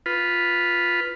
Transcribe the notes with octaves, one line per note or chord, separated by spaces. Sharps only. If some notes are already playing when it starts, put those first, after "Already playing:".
F4 B4